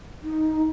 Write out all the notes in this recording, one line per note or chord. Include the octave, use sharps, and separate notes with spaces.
D#4